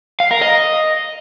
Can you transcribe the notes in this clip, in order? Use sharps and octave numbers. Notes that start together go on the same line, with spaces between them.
F5
A#4
D#5